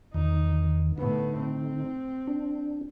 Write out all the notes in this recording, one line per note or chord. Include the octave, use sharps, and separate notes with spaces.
E2 D#3 D#4
A2 D3 B3 D#4
C4
D4